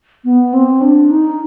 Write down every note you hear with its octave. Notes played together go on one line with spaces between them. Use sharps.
B3
C4
D4
D#4